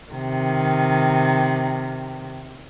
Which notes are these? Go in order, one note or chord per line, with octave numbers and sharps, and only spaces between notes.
C3 D#3